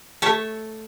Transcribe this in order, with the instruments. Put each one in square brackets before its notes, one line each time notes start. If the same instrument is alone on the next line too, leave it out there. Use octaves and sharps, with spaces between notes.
[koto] A3 C#5 E5 A5